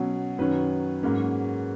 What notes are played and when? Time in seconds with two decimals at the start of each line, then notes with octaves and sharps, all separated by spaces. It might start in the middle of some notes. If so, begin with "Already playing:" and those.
Already playing: B2 F#3 C#4
0.39 F#2 D#3 F#3 C#4 B4
1.03 G#2 F#3 A#3 C#4